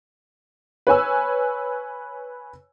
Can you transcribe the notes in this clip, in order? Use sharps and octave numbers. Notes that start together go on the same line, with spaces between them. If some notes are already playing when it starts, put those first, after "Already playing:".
B4 C#5 G#5 E6